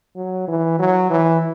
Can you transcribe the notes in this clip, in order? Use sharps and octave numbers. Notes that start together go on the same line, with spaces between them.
F#3
E3
F#3
E3